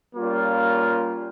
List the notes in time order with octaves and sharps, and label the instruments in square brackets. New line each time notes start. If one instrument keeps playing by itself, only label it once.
[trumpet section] G3 A#3 C#4 F4